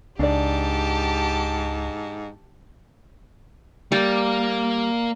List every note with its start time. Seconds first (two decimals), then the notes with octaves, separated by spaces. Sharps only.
0.19 C#2 G#2 D4 G4 D5 A5
3.92 G3 A#3